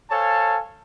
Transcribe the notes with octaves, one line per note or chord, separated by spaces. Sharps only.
A4 C5 C#5 F5 G#5 A5